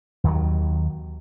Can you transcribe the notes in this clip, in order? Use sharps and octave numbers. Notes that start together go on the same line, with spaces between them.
D#2 D#3 F#3